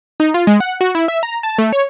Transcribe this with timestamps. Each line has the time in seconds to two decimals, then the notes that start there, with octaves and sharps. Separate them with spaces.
0.20 D#4
0.34 F4
0.47 G#3
0.60 F#5
0.81 F#4
0.95 E4
1.08 E5
1.23 A#5
1.43 A5
1.58 A3
1.73 C#5